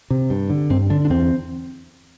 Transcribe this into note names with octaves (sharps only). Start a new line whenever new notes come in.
C3
G2
D3
G2 C4
D3 D4
D4
E2 C4